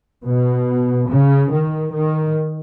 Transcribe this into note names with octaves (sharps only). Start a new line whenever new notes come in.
B2
C#3
D#3
D#3